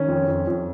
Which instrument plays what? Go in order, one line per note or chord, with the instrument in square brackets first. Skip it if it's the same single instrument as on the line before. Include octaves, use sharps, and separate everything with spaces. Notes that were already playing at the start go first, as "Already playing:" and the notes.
Already playing: [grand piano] D#3 C#4
F2
F2
F2